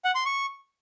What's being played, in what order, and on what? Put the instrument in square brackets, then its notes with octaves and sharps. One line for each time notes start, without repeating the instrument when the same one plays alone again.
[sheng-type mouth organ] F#5
C6
C#6